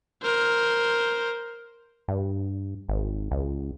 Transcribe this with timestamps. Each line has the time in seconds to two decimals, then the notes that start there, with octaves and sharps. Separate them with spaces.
0.23 A#4 C5
2.08 G2
2.88 G#1
3.31 C#2